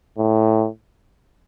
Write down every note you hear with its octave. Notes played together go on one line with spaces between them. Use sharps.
A2